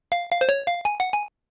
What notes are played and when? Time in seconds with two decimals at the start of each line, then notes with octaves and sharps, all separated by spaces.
0.12 F5
0.31 F5
0.41 C5
0.49 C#5
0.67 F5
0.85 G#5
1.00 F#5
1.13 G#5